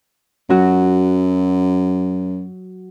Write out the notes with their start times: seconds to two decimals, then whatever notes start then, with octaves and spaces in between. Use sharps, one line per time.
0.50 F#2 F#3 F#4